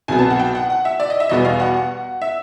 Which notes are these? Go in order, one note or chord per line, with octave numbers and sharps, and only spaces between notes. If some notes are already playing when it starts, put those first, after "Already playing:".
C2 B2 F#3 B3 G#5
A5
F#5
G5
F#5
F#5
E5
D5
D#5
E5
E2 B2 G3 B3 D#5
F5
F#5
E5